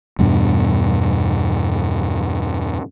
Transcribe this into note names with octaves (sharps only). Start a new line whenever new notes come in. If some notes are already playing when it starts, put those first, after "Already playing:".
E2 G2 B2 D4